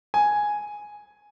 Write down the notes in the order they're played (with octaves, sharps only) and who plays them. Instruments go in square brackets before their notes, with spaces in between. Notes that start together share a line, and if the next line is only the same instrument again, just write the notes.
[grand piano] G#5